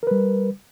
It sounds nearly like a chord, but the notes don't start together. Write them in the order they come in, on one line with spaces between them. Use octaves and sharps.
A#4 B4 G3